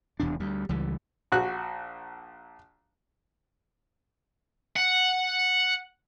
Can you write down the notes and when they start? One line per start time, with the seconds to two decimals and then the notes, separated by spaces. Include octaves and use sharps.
0.20 E1 E2 C3 D4
0.40 D2 G3
0.69 C#2 E3 G3
1.32 A#1 F#4 F#6
4.76 F#5